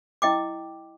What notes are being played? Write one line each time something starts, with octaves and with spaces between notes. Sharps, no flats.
E4 D#5 G5 D6